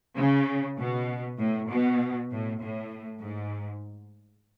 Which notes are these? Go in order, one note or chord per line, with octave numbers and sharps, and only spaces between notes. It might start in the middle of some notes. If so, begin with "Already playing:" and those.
C#3
B2
A2
B2
A2
A2
G#2